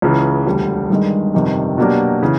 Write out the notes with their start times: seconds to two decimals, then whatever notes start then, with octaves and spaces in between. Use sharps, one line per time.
0.02 C#2 C#3 E3
0.46 E1 D2 D3 G3
0.90 G1 G2 D#3 G#3
1.34 G1 F2 C3 D#3 G3
1.78 B2 F#3 A#3 D4 G4
2.22 C#3 E3